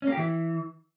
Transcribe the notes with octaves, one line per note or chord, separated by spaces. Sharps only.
C#4
A#3
G4
E3